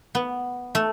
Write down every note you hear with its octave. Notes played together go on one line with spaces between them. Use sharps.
B3
A3